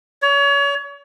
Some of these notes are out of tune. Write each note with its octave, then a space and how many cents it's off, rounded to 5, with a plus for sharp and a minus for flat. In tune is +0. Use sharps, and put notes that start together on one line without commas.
C#5 +30